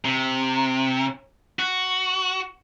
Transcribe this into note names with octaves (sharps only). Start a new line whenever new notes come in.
C3
F#4